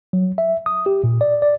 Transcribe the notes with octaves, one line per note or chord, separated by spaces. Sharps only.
F#3
E5
D#6
G4
A#2
D5
D5